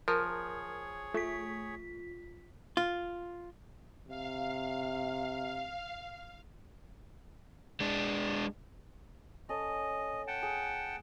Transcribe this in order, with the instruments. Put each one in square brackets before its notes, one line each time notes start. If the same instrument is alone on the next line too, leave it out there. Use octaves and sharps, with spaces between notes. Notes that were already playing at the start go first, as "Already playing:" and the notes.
[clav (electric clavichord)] F3 [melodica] G#4 C#5 [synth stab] A#4
[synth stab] A3 [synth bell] F4 B6
[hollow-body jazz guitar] F4
[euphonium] C3 [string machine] F5
[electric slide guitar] G#3 D4
[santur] C#4 A4 [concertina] D#5
[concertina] F#5 G5 A5
[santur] G#4